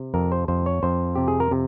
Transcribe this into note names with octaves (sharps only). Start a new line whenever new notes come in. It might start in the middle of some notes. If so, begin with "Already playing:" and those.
Already playing: C3
F2 A#4
C5
F2 C5
C#5
F2 C5
C3 G4
G#4
A#4
C3